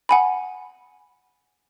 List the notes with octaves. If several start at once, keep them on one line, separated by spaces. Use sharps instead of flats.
F#5 G#5 B5